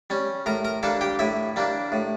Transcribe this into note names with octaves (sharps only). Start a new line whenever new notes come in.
G3 C#4
A2 A#4 A#5
A#4 A#5
G3 A#3 D4 A4 A5
G4 G5
A2 E4 E5
G3 A#3 D4
A2